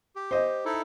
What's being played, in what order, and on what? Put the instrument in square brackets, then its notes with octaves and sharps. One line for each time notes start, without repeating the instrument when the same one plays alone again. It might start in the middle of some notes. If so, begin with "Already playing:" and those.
[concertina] G4
[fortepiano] C5 D#5
[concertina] D#4 E4 A4